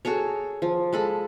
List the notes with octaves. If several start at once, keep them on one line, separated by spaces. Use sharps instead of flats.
F#4 G#4 A4 C#5
F3
G#3 A4 B5